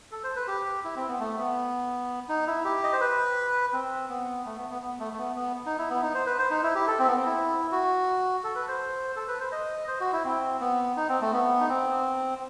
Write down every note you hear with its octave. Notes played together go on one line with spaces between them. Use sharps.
A4
C5
B4
G4
E4
C4
B3
A3
B3
D#4
E4
G4
D#5
C5
B4
C4
B3
A3
B3
B3
B3
A3
A3
B3
B3
D#4
E4
B3
D#4
C5
B4
C5
D#4
E4
G4
A4
C4
B3
C4
E4
F#4
A4
B4
C5
A4
B4
C5
D#5
C5
F#4
E4
C4
B3
D#4
C4
A3
B3
D#4
C4